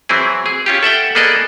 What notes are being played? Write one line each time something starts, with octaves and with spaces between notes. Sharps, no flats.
E3 F#3 C4 E4 G#4
G#4
C#4 F4 G4
A4 E5 F#5 G5
A#3 B3 G#4 A4 D5 D#5